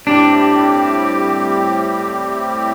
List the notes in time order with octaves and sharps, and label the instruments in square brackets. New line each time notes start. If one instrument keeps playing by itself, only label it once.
[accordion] A2 G3 C4 G4 [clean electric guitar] D4